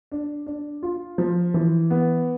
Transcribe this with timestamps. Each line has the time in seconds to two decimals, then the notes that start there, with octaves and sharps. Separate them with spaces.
0.12 D4
0.46 D4
0.83 F4
1.18 F3
1.54 E3
1.90 B3